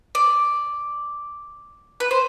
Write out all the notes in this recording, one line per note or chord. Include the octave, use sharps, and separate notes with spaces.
D5
B4
C5